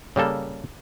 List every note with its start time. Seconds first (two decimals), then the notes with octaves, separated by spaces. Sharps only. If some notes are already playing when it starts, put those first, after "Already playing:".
0.16 C#3 G3 A#3 A4